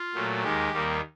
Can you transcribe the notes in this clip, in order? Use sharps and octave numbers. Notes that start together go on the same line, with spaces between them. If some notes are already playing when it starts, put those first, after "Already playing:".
Already playing: F4
A#2 F#3 A3
D#2 D#3 G#3 G4
D#2 D#3 G3 A#3